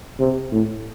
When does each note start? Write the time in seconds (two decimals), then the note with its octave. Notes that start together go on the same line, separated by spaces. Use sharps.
0.20 C3
0.52 A2